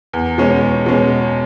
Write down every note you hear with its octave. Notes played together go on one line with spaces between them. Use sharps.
E2
B2 G#3 C#4
E2
B2 G#3 C#4